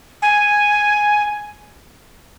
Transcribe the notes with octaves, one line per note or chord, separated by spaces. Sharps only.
G#5